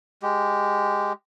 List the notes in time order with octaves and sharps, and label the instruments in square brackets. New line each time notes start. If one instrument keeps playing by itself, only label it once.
[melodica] G#3 G4